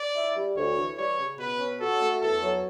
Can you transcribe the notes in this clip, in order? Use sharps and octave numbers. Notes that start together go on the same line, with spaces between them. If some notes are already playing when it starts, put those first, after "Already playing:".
Already playing: D5
E4
G3
D2 C#5
E3
G3 C#5
C#3
B2 B4
C#4
F#4 A4
A3
E2 A4
F#3